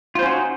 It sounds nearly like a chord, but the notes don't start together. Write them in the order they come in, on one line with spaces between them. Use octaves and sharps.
F4 C5 C#4 F#4 D#4